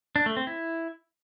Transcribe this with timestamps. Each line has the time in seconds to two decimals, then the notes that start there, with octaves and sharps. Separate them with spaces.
0.16 D4
0.26 A3
0.37 C4
0.47 E4